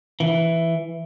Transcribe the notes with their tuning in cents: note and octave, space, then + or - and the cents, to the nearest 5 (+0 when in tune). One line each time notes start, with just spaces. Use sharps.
E3 +5